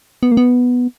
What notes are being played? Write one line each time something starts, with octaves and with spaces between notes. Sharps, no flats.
B3
A#3
B3